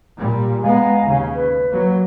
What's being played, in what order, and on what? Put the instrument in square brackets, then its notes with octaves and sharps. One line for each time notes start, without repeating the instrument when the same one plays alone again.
[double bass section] A#2 G3
[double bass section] G#3 B3 [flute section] F5 G#5 A#5
[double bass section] D#2 C#3
[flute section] B4
[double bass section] F#3 A#3